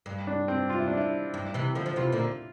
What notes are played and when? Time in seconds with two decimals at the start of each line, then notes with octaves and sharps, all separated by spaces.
0.06 G2
0.27 D4
0.48 C4
0.70 F4
0.79 E4
0.88 D4
0.97 E4
1.34 G2
1.54 C3 E3
1.75 D3 F3
1.86 F3
1.96 C3 E3 F4
2.12 A#2 D3